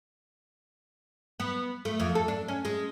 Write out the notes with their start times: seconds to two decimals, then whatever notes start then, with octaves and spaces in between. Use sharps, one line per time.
1.40 B3
1.85 A3
2.00 F2
2.15 A4
2.28 D4
2.48 C#4
2.65 G#3